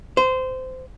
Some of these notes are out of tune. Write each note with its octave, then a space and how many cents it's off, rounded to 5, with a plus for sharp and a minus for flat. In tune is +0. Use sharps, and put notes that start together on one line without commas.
C5 -20